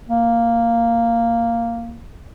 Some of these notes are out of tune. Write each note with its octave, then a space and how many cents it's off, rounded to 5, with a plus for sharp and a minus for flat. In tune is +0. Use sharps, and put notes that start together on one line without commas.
A#3 -5